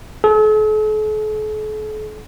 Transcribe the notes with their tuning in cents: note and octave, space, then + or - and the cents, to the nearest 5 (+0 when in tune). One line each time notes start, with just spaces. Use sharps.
A4 -45